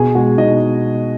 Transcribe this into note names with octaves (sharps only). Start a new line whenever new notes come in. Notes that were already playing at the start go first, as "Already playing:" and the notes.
Already playing: B2 G#4 G#5
G#3 F#4 F#5
B2 D#4 D#5